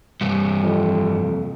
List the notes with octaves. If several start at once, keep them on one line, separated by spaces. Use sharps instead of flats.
C2 G2
F2